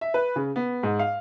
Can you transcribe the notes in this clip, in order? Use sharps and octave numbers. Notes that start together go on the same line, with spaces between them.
E5
B4
C#3
B3
G#2
F5